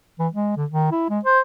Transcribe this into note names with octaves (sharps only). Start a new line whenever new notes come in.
E3
G#3
D3
D#3
E4
G#3
C5